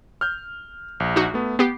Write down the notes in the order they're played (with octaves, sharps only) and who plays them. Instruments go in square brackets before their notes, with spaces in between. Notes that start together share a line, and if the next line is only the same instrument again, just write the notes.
[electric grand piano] F6 G6
A#1
[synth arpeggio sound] D#4 F#4
[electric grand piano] A3 B3
[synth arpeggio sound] B3 G4 [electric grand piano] C7